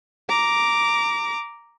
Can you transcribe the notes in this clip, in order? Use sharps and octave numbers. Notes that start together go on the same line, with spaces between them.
A#5 D6